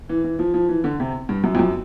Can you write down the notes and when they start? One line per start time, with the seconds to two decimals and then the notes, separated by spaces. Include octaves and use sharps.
0.09 E3
0.24 E3
0.39 F3
0.54 F3
0.69 E3
0.84 D3
1.00 C3
1.29 G2
1.44 F#2
1.55 F2
1.59 F#2